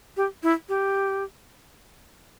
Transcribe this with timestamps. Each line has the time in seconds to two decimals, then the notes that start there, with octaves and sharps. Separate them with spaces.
0.17 G4
0.43 E4
0.69 G4